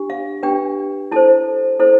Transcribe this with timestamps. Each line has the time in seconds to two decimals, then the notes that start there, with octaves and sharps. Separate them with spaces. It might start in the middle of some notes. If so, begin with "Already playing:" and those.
Already playing: D4 G4
0.10 F5
0.43 D4 G4 B4 G5
1.11 E4 A4 C5 A5
1.80 E4 A4 C5